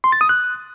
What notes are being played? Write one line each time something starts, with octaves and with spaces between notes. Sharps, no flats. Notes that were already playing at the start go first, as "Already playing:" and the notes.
C6
A6
D#6
F#6